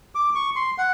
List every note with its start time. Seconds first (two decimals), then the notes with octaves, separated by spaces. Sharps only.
0.15 D6
0.35 C#6
0.56 C6
0.78 F#5